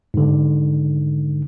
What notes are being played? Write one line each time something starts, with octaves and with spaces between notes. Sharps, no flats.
G#2 D3